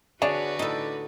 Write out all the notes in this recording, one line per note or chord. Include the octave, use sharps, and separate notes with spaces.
D3 D4 F#4 G#4 B4 C#5 D5
A2 D#4 A4